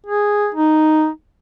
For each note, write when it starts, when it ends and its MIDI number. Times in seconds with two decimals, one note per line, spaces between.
0.06 0.50 68
0.55 1.08 63